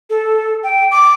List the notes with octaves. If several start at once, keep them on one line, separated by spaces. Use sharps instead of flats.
A4
G5
D6